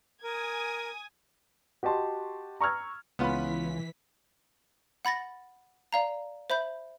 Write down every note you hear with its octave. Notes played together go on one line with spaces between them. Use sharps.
A#4 G#5 D#6 G#6
F#4 G4 D#5 A5 C6
A#5 C#6 E6 F6 G#6
C#2 E3 B3 C#4 F4 B5 B6
F#5 B5 A6 A#6
D5 F5 A#5
C5 E5 B5 G6